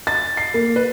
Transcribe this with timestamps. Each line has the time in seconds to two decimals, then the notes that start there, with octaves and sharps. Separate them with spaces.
0.07 A6
0.37 C7
0.54 A#3
0.76 B4